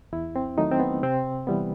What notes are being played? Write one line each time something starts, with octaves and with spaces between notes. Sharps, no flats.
E2 E4
C4
D#3 F#3 A3 D#4
C4
B3
C3 C4
E3 G3 B3